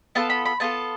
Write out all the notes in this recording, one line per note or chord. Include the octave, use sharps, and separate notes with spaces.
B3 F4 A4 A5
B5
B5
B3 F4 A4 A5